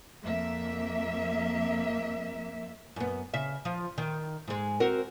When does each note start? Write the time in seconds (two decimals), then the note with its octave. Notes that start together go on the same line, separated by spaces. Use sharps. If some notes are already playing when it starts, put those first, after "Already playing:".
0.22 F2 A#3 E5
2.96 F#2 B3
3.34 C#3 E5
3.65 F3
3.98 D#3
4.47 G#2 G#3
4.80 C4 F#4 A#4